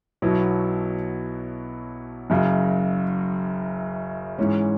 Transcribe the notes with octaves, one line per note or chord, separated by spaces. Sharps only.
B1 B2 F#3 B3 E4
F#1 F#2 C#3 F#3
G#2 E3 G#3 C#4